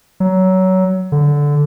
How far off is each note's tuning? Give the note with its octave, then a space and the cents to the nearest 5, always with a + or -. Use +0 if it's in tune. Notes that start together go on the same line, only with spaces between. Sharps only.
F#3 +20
D3 -10